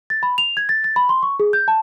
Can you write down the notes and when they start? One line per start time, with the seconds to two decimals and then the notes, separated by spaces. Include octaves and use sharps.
0.10 A6
0.23 B5
0.38 F7
0.57 G#6
0.69 A6
0.84 A6
0.96 B5
1.09 C6
1.23 C#6
1.40 G#4
1.53 G6
1.68 A5